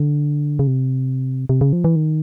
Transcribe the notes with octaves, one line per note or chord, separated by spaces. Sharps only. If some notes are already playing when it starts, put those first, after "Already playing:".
Already playing: D3
C#3
C3
C3
C#3
F3
E3
D#3